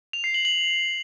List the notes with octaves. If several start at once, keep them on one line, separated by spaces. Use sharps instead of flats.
F7
C7
F#7
F#7